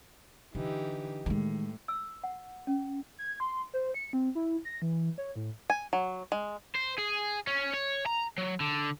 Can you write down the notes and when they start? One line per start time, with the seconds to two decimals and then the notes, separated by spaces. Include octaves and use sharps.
0.55 D3 E3 D#4 G4
1.26 A2 D#3 G#3
1.88 E6
2.24 F#5
2.67 C#4
3.18 G#6
3.40 C6
3.74 C5
3.94 C#7
4.13 C4
4.35 E4
4.65 A#6
4.82 E3
5.18 C#5
5.36 A2
5.70 G#5
5.93 F#3
6.32 G#3
6.75 C5
6.99 G#4
7.47 C#4
7.73 C#5
8.06 A#5
8.38 F#3
8.60 D3